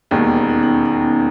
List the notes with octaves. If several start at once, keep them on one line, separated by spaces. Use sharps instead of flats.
E1 D#2 D#3 B3
B3
C#4
D#4
D#4
C#4
D#4